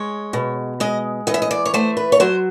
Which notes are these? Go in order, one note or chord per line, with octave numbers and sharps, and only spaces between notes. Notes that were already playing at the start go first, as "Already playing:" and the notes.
Already playing: G#3 C#5
B2
G#3 D#5
E3 D#5
E5
D#5
D5
C#5
A3 C5
B4
C#5
F#3 C5